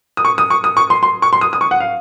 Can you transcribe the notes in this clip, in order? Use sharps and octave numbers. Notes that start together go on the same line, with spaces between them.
D#6
C#6
D#6
C#6
D#6
C#6
C6
C6
C#6
C6
D#6
D#6
C#6
F#5
F5